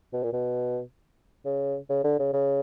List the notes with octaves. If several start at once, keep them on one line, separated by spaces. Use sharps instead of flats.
B2
A#2
B2
C#3
C#3
D3
C#3
C#3